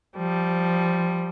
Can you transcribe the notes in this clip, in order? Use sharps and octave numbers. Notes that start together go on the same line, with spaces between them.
F3 G3